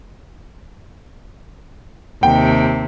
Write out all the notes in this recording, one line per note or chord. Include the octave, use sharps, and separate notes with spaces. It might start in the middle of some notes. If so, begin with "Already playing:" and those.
D#2 C3 G5